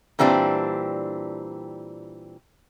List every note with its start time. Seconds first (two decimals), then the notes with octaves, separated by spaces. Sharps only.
0.19 A#2 E3 G3 C4 D4